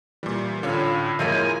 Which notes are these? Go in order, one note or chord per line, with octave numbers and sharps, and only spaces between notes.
A#2 E3 G3
A2 D3 C#4 F4 C#5
F#2 F3 G#3 A#3 E4 C#5 G#5 A#6